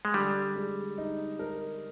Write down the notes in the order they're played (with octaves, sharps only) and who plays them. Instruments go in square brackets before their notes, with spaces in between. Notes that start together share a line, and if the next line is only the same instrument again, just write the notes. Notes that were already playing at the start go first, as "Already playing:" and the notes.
[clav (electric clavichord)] G#3
[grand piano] D3 [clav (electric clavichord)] G3
[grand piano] G#3
D#4
A#4